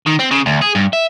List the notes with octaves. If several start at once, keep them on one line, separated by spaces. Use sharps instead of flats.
D#3
C4
C#3
D2
G#4
G2
E5